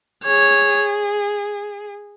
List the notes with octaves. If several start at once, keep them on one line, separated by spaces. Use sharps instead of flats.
G#4 C#5